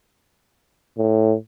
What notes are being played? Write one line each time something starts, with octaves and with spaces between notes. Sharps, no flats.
A2